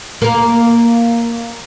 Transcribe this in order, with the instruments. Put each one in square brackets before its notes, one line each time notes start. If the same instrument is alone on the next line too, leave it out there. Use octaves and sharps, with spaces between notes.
[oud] A#3 A#4